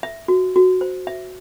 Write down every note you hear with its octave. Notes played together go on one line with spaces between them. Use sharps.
E5
F#4
F#4
C5
E5